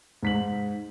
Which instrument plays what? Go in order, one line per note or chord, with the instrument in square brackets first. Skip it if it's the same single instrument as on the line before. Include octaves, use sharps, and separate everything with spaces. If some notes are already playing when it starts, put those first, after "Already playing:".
[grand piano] G#2 B6 F#7